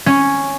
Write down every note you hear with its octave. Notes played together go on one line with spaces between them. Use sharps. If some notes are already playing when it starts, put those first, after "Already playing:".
C#4